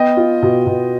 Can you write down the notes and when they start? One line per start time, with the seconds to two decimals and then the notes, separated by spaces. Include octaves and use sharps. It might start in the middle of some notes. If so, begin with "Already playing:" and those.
Already playing: B3 D#5 G5
0.17 F4
0.42 B2
0.67 B2